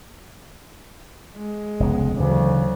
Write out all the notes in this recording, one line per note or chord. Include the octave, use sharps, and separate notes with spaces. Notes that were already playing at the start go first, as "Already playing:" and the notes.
G#3
F1 C#2 B3
D2 C#3 E3 F#3